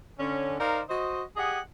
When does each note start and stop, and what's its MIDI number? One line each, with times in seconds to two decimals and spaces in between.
0.19 0.55 50
0.19 0.55 61
0.59 0.81 63
0.59 0.81 70
0.59 0.81 72
0.59 0.81 74
0.59 0.81 77
0.89 1.23 66
0.89 1.23 72
0.89 1.23 75
1.37 1.59 67
1.37 1.59 68
1.37 1.59 75
1.37 1.59 78
1.37 1.59 80